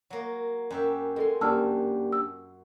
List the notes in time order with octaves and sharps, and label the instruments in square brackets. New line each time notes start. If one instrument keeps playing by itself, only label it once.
[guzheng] F#3 A#3
F#2 G4 E5
[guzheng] G#3 C6 [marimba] A4 A#4
[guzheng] F#2 [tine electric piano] A#3 D4 G4 [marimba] A5 E6 F6
[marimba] E6